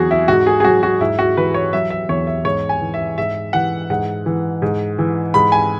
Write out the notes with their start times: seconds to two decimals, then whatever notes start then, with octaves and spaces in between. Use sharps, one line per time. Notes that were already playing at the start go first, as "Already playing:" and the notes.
Already playing: E2 F#3 F#4 G#4
0.11 E4
0.28 G#2 F#4
0.46 G#4
0.60 G#4
0.64 F#3 F#4
0.83 F#4
1.01 G#2 E4
1.19 F#4
1.37 E3 B4
1.54 C#5
1.73 F#3 E5
1.90 E5
2.09 E2 C#5
2.27 E5
2.45 G#2 C#5
2.69 G#5
2.81 E3
2.94 E5
3.18 G#2 E5
3.53 E3 F#5
3.90 G#2 F#5
4.26 E3
4.62 G#2
4.98 E3
5.34 G#2 B5
5.52 G#5